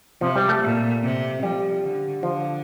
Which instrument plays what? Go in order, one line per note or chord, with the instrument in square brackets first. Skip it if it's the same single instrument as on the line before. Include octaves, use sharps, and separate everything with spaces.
[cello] C3 [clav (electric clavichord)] F3
[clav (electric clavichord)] G3
A3
[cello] A#2
C3
[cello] F3 [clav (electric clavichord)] G3
[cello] D3
[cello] D3 [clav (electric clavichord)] F3